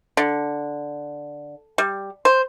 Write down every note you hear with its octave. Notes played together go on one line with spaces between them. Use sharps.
D3
G3
C5